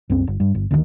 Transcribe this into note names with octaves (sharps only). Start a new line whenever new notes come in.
C2 F#2 C4
G1
G2
G1
D2 A#2 D#3